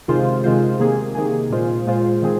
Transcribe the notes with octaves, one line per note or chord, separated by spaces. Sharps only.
C3 D#3 G#3 F4 C5
C3 D#3 G#3 F4 C5
C3 D#3 A#3 G#4
C3 D#3 A#3 G#4
A#2 G#3 F4 C5
A#2 G#3 F4 C5
D#3 G#3 C4 G#4